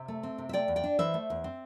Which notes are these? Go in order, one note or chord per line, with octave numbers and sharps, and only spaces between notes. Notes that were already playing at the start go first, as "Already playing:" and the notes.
Already playing: C3 E5
A3
C4
C3
E5
A3 D5 G5
E2
D5 G5
D4
E3 C5 E5
A3
E2
C4